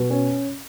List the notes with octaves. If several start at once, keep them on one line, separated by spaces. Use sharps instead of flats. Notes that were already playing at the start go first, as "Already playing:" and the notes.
Already playing: B2
C#4